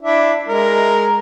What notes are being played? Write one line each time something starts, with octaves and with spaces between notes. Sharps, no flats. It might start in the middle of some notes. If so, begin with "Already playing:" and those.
D4 E4 E5
G#3 A#4